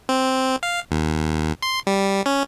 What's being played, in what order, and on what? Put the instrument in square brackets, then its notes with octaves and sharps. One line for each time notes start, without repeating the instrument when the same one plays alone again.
[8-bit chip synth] C4
F5
D#2
C6
G3
C#4